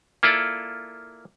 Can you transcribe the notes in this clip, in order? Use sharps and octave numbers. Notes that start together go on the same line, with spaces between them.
A#3 E4 F4 A4 D5